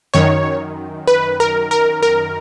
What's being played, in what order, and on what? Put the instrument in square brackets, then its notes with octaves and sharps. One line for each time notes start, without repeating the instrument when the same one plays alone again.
[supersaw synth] F#2 D#3 C#5
B4
A#4
A#4
A#4